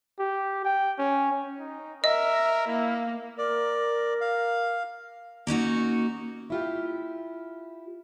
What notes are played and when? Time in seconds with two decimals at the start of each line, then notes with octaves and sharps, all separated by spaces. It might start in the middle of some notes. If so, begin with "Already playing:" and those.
0.19 G4
0.64 G5
0.98 C#4
1.59 D#4
2.04 A#4 D#5 E5
2.67 A#3 E4
3.38 A#4 D5
4.21 F5
5.47 A#3 C#4 D#4 F#4
6.50 E4 F4 G4